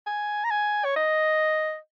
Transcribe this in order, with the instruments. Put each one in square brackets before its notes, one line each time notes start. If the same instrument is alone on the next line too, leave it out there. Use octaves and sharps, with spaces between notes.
[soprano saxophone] G#5
A#5
G#5
C#5
D#5